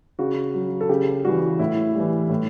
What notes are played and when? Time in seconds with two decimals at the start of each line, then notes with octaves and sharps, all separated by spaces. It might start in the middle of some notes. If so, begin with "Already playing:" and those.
0.19 C#3 F#4
0.55 F#3
0.81 A4
0.89 C#3 G4
1.25 E3 G3 F#4
1.59 A2 E4
1.95 E3 G3
2.29 A2